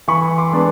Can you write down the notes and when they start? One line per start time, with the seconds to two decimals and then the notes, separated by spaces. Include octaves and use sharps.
0.08 E3 B5 C#6
0.38 C6 D6
0.52 G#3 B3 D4